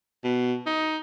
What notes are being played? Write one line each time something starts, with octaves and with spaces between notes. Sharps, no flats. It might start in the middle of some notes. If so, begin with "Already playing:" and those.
B2
D#4